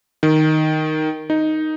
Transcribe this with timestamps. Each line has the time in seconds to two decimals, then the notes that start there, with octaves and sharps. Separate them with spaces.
0.23 D#3
1.30 D#4